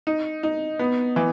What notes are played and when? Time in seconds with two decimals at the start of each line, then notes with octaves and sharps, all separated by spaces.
0.07 D#4
0.43 D#4
0.79 B3
1.16 E3